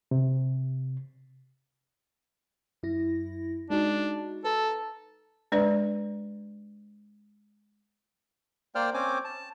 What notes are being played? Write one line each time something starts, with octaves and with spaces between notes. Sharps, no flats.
C3
F#2 E4 A#6
G#3 D4 D#4 F#4
A4 B4 A#5
G#3 D4 B4 D5
A#3 C5 D5 G5 F6
C4 C#4 C5 G#5 D6
A5